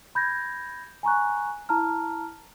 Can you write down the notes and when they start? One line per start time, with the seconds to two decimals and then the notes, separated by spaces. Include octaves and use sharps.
0.15 B5 G6 G#6 A#6
1.03 G#5 A#5 C#6 F#6
1.69 E4 A5 A#5 F6